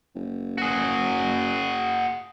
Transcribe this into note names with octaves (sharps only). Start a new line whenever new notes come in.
F#1
F#4 G#4